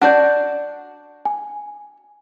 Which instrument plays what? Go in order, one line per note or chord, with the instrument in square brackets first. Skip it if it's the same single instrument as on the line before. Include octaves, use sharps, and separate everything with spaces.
[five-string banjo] D4 F#4 D5 [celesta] F#5 G6
[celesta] G#5